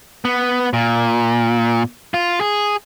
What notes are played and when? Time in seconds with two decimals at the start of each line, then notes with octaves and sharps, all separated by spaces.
0.25 B3
0.73 A#2
2.14 F4
2.41 G#4